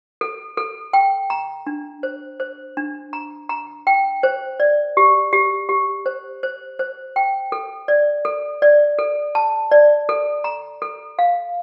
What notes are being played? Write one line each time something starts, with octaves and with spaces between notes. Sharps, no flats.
A4
A4
G5
A#5
D4
C5
C5
D4
A#5
A#5
G5
C5
D5
G4
G4
G4
C5
C5
C5
G5
A4
D5
A4
D5
A4
A5
D5
A4
A#5
A4
F5